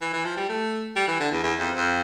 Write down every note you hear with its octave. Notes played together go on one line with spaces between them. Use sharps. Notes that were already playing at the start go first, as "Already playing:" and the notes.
E3
E3
F3
G3
A3
G3
E3
D3
E2
E2
F2
F2